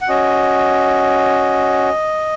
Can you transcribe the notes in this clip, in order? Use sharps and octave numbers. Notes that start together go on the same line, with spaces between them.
F#5
C#4 F#4 D#5